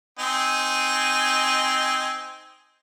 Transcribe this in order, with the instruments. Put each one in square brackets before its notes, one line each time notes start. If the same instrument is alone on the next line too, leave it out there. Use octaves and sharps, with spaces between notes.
[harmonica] C4 D#4 G#5